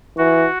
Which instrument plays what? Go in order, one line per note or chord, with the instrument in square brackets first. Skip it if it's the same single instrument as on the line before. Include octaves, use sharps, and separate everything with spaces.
[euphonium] E3 [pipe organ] F#4